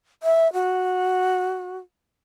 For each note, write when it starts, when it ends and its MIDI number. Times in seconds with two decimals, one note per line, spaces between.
0.23 0.51 76
0.53 1.78 66